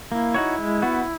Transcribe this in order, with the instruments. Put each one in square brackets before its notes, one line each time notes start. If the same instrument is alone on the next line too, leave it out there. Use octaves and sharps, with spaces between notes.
[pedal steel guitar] A#3 [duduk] E4
[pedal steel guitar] D#4 F#4 C#5
G#3
B3 F#4